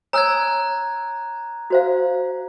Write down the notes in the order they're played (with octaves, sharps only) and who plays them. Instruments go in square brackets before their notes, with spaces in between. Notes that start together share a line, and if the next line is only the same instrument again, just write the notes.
[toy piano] C#5 G#5 E6 [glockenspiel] A#5 F#6 G#6
[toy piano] F#4 C5 F5